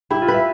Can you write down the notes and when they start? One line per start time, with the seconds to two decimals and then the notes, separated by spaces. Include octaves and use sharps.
0.10 E4 G4
0.22 F4
0.28 B4
0.34 E5